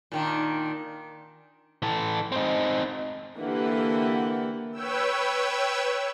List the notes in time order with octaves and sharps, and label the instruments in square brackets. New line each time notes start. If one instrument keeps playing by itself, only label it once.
[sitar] A#2 D#3 D4
[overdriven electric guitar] E3 A4
C4 D#4
[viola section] D3 E3 A#3 G4 B4 F#5
[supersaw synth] B4 C#5 G5 E6